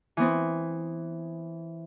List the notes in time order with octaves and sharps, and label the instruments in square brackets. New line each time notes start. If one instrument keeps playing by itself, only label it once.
[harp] E3 B3 C4